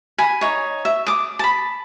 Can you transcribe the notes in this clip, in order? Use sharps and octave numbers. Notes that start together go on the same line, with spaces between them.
G#5 B5
D#4 C#5
E5
D6 D#6
A5 B5